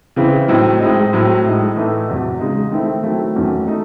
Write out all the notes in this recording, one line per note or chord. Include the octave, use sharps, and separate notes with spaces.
C#3 E3 C4 E4
A2 F#3 C4 D#4
A2 G#3 C4 D#4
A2 F#3 C4
A2 G#3 D#4
A2 E3 A3 D#4
E2 C3 F#3
C#3 G#3 D#4
D#3 A3 C4 E4
D#3 F#3 A3 C4 E4
E2 D#3 F#3 A3 C#4
A3 D#4